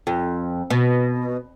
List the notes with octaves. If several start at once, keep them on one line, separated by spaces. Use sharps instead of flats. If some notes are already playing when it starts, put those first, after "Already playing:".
F2
B2